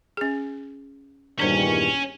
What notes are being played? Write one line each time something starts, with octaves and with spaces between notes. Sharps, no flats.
C#4 G#4
E2 G2 A#2 D#3 G3 C#4 D4 C5